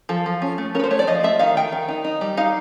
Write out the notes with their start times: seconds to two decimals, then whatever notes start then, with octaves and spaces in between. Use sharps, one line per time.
0.09 F3 A4
0.26 F3
0.42 C#4
0.58 A3
0.75 C#4 A#4
0.80 B4
0.84 C5
0.91 A3 C#5
0.99 D5
1.07 F3 D#5
1.23 A3 E5
1.39 D#3 F5
1.57 D#3 G5
1.72 D#3
1.89 D#4
2.04 D#4
2.21 G3
2.37 D#4 F5